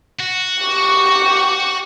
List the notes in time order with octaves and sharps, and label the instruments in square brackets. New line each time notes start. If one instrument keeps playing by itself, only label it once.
[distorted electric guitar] F#4
[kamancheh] G4 C#6